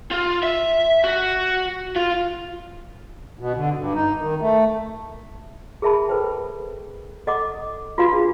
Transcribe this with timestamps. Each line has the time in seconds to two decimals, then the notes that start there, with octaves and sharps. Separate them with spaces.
0.12 F4
0.43 E5
1.04 F#4
1.96 F4
3.39 B2
3.56 D3
3.78 G2
3.94 D#4
4.20 D#3
4.41 A3
5.82 G#4 A#4 E5 A5 B5
6.08 A4 B4 C5 G5
7.27 A4 D#5 F#5 D6 D#6
7.98 F4 F#4 B4 F5 B5
8.13 D4 G#4